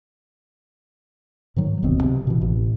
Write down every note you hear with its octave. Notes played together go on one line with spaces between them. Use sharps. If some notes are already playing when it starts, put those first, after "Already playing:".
G#2 D#3 F#3
F1 D2 B2 C4
C3
B2 E3
A1